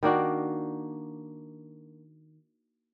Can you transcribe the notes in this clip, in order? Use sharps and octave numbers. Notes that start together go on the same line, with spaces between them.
D#3 A#3 D4 F#4